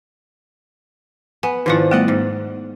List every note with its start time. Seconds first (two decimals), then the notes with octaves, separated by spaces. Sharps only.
1.43 B3 G#5
1.66 G#2 D#3 F3 D4 E4
1.91 G3 A3 B3 D5 D#5 F#5
2.08 G#2